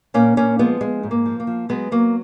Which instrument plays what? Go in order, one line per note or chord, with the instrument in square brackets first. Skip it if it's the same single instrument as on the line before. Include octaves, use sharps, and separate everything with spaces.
[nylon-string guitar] A#2 A#3 C#4
A#2 A#3 C#4
F3 G#3 B3
F3 G#3
G#2
A#3
F3
A#3
F3
F#3 G#3 B3
F#3 A#3